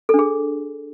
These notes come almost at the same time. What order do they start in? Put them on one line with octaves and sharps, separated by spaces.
A4 D4 G#4